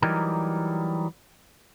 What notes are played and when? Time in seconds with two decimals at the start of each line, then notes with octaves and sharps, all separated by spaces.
0.02 E3 F#3 G3 D#4 G4 A#4